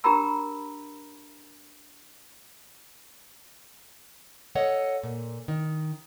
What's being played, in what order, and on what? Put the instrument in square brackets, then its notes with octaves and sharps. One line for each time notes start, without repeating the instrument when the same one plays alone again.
[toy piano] D4 G4 A#4 A#5 B5 E6
[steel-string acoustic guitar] A4 C#5 D#5 F#5
A#2
D#3